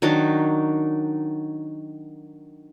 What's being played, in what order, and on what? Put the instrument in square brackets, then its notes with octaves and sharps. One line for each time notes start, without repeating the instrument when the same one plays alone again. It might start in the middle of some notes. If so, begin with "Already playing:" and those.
[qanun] D#3 F#3 D4 D#4